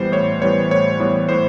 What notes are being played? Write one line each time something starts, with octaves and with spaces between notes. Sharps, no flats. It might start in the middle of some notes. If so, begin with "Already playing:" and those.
Already playing: A2 E3 G3 B3 C5
A2 C#5
E3 G3 B3 C#5
A2 C#5
E3 G3 B3 C#5
A2 C5